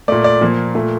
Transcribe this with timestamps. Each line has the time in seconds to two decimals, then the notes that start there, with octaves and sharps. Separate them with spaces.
0.08 A#2 A3 D5
0.24 D5
0.41 A#2 F3 A#3
0.75 A#2 A3